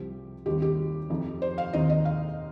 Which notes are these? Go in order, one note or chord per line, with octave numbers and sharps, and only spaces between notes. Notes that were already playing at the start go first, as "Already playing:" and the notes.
Already playing: C2 C3 F3 C4 G4
D#2 D#3 G3 C4 G4
G4
F2 F3 D#4
C5
F5
D#2 D#3 C4 D#4 D#5
D#5
F5